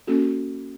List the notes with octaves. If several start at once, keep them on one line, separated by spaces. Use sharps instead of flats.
A#3 C#4 F#4 A4